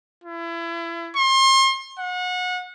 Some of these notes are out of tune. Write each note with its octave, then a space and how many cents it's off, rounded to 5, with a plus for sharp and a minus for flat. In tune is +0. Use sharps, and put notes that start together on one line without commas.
E4 +30
C6 +35
F#5 -30